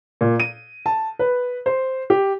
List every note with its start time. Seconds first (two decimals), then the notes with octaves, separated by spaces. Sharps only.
0.21 A#2
0.40 D#7
0.86 A5
1.19 B4
1.66 C5
2.10 G4